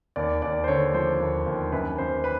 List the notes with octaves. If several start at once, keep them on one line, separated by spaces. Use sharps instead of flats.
D#2 D5
D#2 D5
C5
D3 C#5
F3 C5
D#2
D#2
F#2 B4
F#2 C5
B4